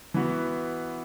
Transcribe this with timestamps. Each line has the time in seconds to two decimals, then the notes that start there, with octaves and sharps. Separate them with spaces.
0.14 E3 B3 F#4